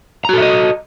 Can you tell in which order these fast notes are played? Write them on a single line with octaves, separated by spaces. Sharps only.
A#5 F#4 A4 E5 D#5